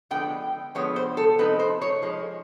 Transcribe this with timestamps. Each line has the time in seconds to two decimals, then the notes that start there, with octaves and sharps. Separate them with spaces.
0.11 D3 F3 G#3 B3 G5
0.75 D3 F3 G#3 B3 C#5
0.96 C5
1.17 A4
1.38 F3 G#3 C4 D#4 B4
1.59 C5
1.82 C#5
2.02 F3 G#3